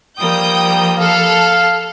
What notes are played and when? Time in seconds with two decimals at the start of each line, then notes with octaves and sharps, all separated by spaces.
0.19 F3 G3 A#3 G5 D#6 G6
0.97 A4 F5